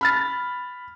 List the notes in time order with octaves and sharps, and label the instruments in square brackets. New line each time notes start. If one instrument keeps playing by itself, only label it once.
[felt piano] B5 F6 A6